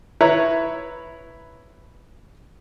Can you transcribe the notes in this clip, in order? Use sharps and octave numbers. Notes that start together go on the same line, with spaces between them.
E4 B4 C#5 A#5